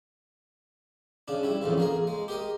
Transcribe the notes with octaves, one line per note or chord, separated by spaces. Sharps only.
C#3 D4
G3 E4
F2 A2 C#3 E3
A#3 G#4 A#4
G#3
G4 A#4 D#5